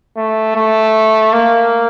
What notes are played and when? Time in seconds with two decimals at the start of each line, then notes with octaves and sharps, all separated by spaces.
0.17 A3
0.56 A3
1.33 A#3